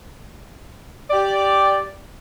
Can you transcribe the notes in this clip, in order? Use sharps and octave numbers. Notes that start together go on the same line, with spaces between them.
G4 D5